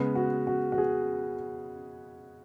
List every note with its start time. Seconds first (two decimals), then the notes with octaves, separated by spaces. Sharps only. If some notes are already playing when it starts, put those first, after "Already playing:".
Already playing: C#3 G#3 B3
0.15 F#4
0.47 F#4
0.72 F#4
0.78 G#4